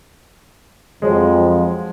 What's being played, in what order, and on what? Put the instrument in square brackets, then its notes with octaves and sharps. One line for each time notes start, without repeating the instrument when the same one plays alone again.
[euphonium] F2 [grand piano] F3 F#3 G#3